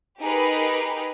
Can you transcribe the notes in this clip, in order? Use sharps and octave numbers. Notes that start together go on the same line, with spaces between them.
D#4 G4 G#4 A#4 B4